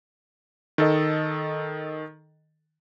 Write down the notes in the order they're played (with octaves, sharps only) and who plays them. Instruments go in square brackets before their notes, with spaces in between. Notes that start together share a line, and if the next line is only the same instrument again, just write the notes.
[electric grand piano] D#3 A4 D#5